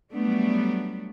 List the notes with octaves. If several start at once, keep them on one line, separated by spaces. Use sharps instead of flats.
F#3 G3 A3 B3 D4